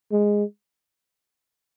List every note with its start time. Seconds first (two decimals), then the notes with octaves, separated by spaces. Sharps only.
0.12 G#3